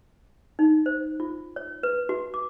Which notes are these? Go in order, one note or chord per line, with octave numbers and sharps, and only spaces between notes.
D#4
C5
F4
C#5
B4
F#4
D6